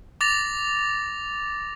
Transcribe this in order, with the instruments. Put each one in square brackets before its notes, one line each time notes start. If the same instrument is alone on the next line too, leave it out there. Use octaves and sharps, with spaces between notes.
[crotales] D6 A6 A#6 F7